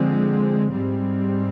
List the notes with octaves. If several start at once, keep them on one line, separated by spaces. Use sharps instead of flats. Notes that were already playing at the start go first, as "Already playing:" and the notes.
Already playing: D3 F3 G#3 C4
G#2 G3 C4